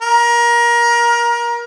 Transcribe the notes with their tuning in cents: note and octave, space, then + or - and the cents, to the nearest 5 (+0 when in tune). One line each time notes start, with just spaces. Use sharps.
A#4 +25